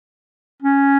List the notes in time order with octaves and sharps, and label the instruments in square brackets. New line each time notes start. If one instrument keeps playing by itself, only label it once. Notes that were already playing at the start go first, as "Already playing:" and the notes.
[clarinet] C#4